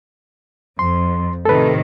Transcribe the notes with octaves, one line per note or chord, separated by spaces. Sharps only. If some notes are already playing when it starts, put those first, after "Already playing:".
F2 C6
A2 C3 D#3 A4 B4